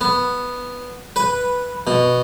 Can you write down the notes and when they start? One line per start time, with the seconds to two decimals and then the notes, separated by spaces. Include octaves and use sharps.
0.01 B3
1.16 B4
1.87 B2